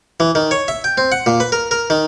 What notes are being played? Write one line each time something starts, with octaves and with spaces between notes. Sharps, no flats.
E3
D#3
C#5
E5
G5
C4
F#5
A#2
B4
A#4
A#4
D#3